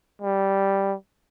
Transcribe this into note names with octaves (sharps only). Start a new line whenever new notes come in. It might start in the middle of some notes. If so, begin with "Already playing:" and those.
G3